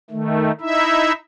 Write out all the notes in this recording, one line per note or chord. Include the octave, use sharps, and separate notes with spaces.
D#3 A3
D#4 E4 E5